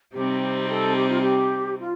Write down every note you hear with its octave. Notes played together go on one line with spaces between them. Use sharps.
C3 G3 C4 D#4 G4
G4
A4
G4
F4
G4
F4